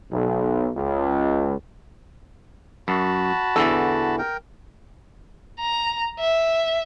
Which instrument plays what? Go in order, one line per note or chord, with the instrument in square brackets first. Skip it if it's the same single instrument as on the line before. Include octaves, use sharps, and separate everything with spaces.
[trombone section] B1
C#2
[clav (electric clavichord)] F#2 [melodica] F#4 A5 B5
[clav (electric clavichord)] E2 D3 E3 [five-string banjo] A4
[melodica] A#4 G5
[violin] A#5
E5